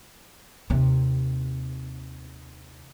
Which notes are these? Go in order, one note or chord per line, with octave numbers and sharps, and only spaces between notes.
D#2 C3